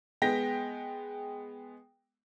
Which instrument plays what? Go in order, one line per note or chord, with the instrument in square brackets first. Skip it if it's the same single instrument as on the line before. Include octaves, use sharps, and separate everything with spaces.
[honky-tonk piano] G#3 B3 G5 A#6 B6